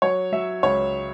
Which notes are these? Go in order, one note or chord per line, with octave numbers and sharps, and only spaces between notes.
F#3 C#5
F#3 E5
C#2 C#5